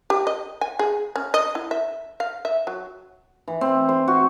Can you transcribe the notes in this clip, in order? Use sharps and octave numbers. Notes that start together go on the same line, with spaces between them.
G4
D#5
G#5
G#4
C#4
D#5
E4
E5
F5
E5
F#3
E3
C4
C5
F#4